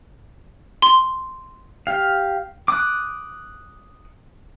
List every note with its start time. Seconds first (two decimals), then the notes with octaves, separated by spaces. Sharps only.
0.82 C6
1.87 G4 F5
2.68 D6 D#6 F#6